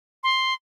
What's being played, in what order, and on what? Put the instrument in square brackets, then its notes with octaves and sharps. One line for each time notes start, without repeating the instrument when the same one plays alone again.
[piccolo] C6